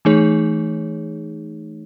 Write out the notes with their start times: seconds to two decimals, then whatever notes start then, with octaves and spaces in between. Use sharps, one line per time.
0.05 E3 A3 D#4 G#4 C#5